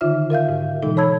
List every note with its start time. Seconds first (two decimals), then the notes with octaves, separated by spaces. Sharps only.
0.01 D3 D#3 D#4 F4 E5 F6
0.30 A#4 E5 F5 G6
0.49 G#2
0.82 B2 E3 G#3 D#4 A4
0.97 C#5 A5 B5 E6 G#6